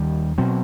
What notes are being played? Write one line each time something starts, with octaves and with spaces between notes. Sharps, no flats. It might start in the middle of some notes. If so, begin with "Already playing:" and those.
Already playing: D#2 D#3 G3
B2 F#3 C4